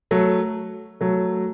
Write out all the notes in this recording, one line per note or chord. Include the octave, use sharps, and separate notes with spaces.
F#3 A3
F#3 A3